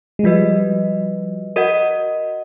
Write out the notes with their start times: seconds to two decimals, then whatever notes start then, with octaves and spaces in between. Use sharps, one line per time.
0.19 G#3
0.24 F3 G3 F#4 B4 D#5
1.56 F#4 A#4 D#5 F#5